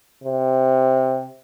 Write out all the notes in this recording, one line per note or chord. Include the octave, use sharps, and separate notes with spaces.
C3